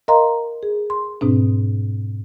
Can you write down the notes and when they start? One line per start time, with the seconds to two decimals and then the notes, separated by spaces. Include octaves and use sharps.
0.08 A#4 D#5 F5 A#5 C6
0.63 G#4
0.90 C6
1.21 G#2 B2 C4 D4